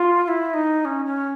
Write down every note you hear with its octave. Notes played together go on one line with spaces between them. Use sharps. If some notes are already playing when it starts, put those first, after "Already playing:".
Already playing: F4
F4
E4
D#4
C#4
C#4